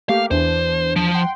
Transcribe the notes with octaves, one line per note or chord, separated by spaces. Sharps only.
A3 A#3 G4 F5
E2 E3 D4 C5
F3
F#5 G5 C6